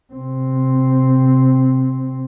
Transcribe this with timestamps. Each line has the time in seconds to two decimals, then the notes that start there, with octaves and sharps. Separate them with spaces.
0.14 C3 C4